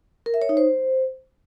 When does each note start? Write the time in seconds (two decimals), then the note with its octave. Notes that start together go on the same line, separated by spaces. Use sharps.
0.26 A#4
0.34 E5
0.42 C#5
0.49 D#4
0.57 C5